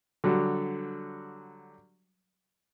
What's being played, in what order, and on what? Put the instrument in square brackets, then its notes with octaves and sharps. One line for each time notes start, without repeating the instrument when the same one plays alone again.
[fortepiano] D3 F#3 G3